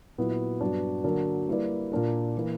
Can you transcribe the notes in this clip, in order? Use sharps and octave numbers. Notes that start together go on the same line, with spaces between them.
A#2 F#3 B3 E4
G2 F#3 B3 D4 F#4
D3 F#3 A#3 D4 A#4
G3 A#3 E4 B4 D5
A#2 A#3 D4 A#4
E3 A#3